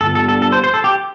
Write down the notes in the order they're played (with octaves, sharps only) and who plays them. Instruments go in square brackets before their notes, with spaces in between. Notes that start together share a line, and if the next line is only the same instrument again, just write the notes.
[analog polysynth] G2 D3 G3 B3 F4 [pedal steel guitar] A4
[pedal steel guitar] A4
A4
A4
C5
C5
A4
G4